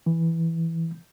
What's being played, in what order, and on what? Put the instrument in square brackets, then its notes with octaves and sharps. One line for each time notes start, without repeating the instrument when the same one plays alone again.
[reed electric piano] E3